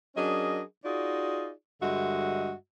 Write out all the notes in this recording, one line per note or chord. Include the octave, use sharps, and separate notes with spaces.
F#3 C#4 D4 G#4 A#4 D#5
D#4 F4 F#4 G#4 D5
G2 D3 G#3 F#4 D#5 E5